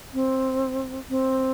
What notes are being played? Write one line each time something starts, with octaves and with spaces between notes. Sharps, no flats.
C4
C4